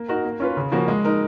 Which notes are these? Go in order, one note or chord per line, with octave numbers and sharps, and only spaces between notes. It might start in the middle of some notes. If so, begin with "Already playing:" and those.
Already playing: A#3
D#4 F#4 A#4
A#3
C#4 F4 B4
C#3
F3 A#3 C#4 F#4
G#3
D#4 A#4